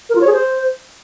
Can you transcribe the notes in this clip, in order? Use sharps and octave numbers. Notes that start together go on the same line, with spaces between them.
A#4
F4
C#5
G#4
C5